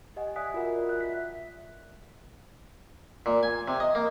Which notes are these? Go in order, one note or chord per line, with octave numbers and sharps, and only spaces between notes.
G4 D#5 F#5 G#5
D5 E5 G#5 D#6 F#6 B6
F4 F#4 A#4 F#5
D5
E5 F#6
B6
A#2
G#5
C3
D#5
A#3